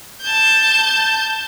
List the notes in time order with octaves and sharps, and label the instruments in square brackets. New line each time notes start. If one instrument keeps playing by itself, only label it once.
[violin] A5 G6